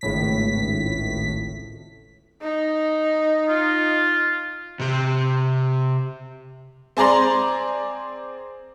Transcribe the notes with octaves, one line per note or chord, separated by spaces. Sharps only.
G#1 C#2 A2 B6
D#4
F4
C3 G4
C4 G#4 D5 A#5 C6